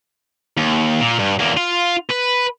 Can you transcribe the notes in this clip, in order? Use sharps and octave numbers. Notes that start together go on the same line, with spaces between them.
D#2
A#2
G2
E2 A#3
F4
B4